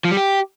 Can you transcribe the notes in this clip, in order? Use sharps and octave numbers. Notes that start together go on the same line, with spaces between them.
F3
G3
G4